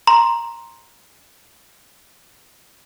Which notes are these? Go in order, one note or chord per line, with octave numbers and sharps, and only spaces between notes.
A#5 C6